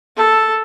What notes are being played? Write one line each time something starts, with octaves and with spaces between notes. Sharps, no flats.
A4